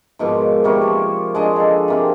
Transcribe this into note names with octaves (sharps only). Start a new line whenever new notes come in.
G#2 B2 F3 A#3
C3 G3 A#3 C#5
F3 F4
G#3 D4 D#5
G#4 A4
C3 A#3 C4